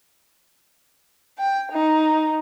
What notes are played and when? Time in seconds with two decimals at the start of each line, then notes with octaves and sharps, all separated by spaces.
1.39 G5
1.72 D#4